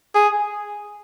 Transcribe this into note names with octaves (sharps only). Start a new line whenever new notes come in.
G#4